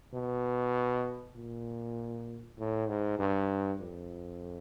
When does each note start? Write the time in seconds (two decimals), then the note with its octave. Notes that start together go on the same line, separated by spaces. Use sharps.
0.14 B2
1.35 A#2
2.58 A2
2.89 G#2
3.19 G2
3.80 F2